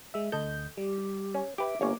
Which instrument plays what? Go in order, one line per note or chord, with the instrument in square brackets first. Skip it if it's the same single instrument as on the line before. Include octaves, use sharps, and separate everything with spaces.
[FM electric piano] G#3 E5
[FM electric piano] D2 D#5 G6 [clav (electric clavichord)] A4
[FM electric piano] G3 [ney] G4
[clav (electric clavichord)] C#4
[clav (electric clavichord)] G4 B4 [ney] E5 [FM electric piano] D6
[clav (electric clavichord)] G1 C#5 G#5 [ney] A#3